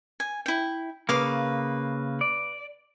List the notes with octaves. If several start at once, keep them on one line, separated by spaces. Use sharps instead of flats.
G#5
E4 G5
C#3 A#3 B4 F5 D6
D5